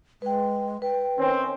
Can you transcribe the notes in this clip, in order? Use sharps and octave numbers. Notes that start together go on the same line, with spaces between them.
G#3 B4 G5
B4 G5
D#3 C4 C#4